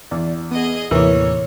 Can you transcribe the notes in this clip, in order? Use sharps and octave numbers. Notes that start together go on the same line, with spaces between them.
E2 D5
B3 G#4 D#5 D#6
D#2 A2 C3 E3 A#3 C#5